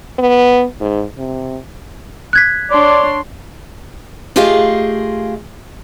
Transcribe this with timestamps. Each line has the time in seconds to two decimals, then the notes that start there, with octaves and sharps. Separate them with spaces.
0.19 B3
0.80 G#2
1.17 C3
2.33 F#6 G#6 B6
2.71 D4 C#5 D5 C6
4.36 A3 F4 G4 G#4 D#5 F5